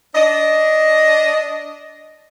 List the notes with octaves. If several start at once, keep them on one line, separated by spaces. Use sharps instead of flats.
D4 D#5